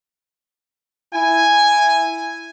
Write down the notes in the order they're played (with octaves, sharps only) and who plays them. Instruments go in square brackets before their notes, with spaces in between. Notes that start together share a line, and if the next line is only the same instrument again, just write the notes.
[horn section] E4 G#5